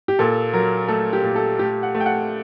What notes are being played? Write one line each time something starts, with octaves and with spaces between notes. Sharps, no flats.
G4
A#2 A4
F#3 A#4
A3 A4
G4
A#2
A4
A3 G4
F#5
A3
G5
F#5